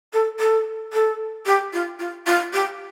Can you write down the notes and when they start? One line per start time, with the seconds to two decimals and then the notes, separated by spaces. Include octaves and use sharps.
0.13 A4
0.39 A4
0.93 A4
1.46 G4
1.73 F4
1.99 F4
2.26 F4
2.53 G4